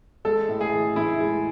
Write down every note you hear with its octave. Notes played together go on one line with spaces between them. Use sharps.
G#3 A4
A2
G#4
E3
A2 E4
G#3